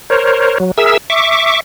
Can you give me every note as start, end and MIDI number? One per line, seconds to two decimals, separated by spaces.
0.10 0.58 70
0.10 0.58 72
0.10 0.58 73
0.60 0.72 54
0.78 0.97 68
0.78 0.97 70
0.78 0.97 76
0.78 0.97 88
1.10 1.60 76
1.10 1.60 85
1.10 1.60 86